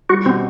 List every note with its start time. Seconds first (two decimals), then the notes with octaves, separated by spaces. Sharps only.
0.09 G3 F#4
0.25 B2 C4